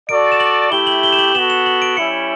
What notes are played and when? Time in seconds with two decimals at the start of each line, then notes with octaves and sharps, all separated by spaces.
0.09 F#4 A4 D5 D7
0.32 E7
0.40 F#7
0.71 A3 E4 G4 G7
0.87 F#7
1.03 G7
1.13 E7
1.18 F#7
1.34 B3 F#4 A4 E7
1.50 E7
1.66 F#7
1.82 D7
1.97 G3 C#4 E4 C#7